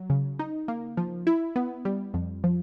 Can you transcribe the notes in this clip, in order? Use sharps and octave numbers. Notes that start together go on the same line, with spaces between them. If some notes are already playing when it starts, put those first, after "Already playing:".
Already playing: F#3
C#3
D#4
A#3
F3
E4
B3
G3
F2
F3